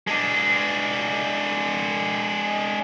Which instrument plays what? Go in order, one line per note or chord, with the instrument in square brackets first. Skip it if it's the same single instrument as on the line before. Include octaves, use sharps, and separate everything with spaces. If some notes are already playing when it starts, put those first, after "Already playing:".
[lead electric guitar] G#3 D4